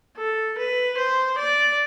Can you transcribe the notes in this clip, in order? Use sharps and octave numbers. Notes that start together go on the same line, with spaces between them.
A4
B4
C5
D5